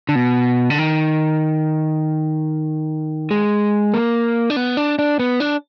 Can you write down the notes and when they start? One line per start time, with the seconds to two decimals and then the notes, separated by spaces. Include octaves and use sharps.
0.09 D3
0.15 B2
0.70 D3
0.78 D#3
3.31 G#3
3.94 A#3
4.50 D4
4.56 B3
4.77 D4
4.99 D4
5.19 B3
5.40 D4